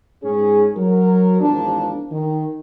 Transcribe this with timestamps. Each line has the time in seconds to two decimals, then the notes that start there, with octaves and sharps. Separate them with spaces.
0.23 G#2 C#4 G#4
0.76 F#3 A#4
1.40 G#1 E2 F3 A#3 D4
2.11 D#3